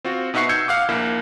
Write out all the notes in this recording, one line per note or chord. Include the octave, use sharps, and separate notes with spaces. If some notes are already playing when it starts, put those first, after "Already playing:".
C4 F4 F#4
B2 D#4 E5 F#5 C#6 C7
E6 G6 G#6 C#7
F5 F#5 D6
A#1 A#3 E4